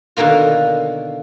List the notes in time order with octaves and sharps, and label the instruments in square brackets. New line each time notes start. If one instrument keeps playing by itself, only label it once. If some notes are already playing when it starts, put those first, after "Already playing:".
[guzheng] B2 D3 D#3 A#3 F4